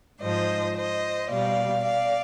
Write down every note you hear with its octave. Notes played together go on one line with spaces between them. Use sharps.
G#2 F3 C5 D#5
C5 D#5
B2 G3 D5 F5
D5 F5